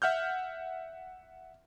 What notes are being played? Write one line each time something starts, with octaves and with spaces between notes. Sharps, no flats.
E5 F#5 F6 G6